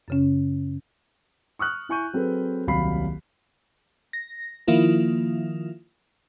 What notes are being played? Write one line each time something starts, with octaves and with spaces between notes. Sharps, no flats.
F#2 C#3 C#4
C#6 D#6 F6 F#6
E4 G#5 C#6 G6 D#7
F#3 C4 G#4 A4 B4
D#1 C2 F#3 F5 B5 C7
A#6
D#3 F3 A#3 E4 F4